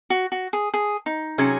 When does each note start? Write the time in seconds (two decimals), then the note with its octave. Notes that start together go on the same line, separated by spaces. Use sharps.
0.10 F#4
0.32 F#4
0.53 G#4
0.74 G#4
1.06 D#4
1.38 C3 F#3 C#4 G#4